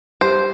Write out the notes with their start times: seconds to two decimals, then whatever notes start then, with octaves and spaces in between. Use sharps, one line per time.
0.21 G3 C5